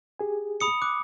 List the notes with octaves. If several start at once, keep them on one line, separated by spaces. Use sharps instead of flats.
G4 G#4 G#5
B5 D#6 C#7
D6 F#6